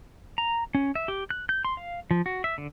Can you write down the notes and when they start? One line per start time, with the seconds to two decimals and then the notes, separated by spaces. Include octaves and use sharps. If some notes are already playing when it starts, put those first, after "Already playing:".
0.38 A#5
0.75 C#4
0.95 E5
1.08 G4
1.30 F#6
1.49 G6
1.65 C6
1.77 F5
2.11 F3
2.26 F#4
2.44 E5
2.58 D3